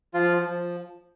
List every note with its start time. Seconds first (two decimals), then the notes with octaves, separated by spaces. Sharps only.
0.14 F3 F4
0.42 F3